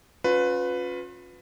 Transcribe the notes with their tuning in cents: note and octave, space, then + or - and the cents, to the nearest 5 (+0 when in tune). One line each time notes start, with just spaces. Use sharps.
C#4 +0 F4 +40 B4 +15